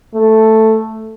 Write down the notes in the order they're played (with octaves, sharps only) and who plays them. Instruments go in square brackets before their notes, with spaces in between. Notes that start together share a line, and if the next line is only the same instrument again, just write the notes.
[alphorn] A3